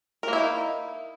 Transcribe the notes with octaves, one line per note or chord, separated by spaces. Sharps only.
A#3 D#4 E4 A#4